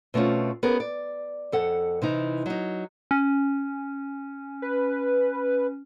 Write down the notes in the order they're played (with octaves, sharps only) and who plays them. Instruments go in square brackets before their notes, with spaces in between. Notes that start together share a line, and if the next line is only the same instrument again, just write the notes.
[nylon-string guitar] B2 A3 C4 C#4 F4
B3 C#4 G#4 A#4
D5
F2 A4 F#5
C3 E3 D#4
F#3 D#4
[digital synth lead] C#4
[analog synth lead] B4